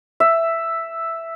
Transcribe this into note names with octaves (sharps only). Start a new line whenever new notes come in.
E5